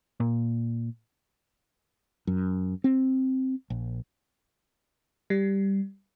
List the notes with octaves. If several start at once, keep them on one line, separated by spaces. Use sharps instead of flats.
A#2
F#2
C4
A#1
G3